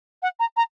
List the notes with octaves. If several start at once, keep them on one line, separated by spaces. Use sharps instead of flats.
F#5
A#5
A#5